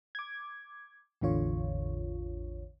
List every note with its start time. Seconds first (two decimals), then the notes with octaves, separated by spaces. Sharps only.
0.15 D6 G#6
1.21 A1 E2 D3 F4 C#5